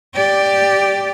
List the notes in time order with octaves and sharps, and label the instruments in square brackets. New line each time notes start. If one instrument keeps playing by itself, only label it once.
[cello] G4 D5